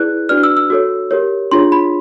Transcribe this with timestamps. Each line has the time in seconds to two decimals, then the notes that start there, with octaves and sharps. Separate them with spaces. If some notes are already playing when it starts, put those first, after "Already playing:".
Already playing: E4 G#4 B4 D5 F#6
0.29 D4 F#4 B4 D5 F6
0.43 E6
0.57 E6
0.70 F#4 A4 C#5
1.11 G4 A#4 C#5
1.51 D4 F4 G#4 C#5 C6
1.72 B5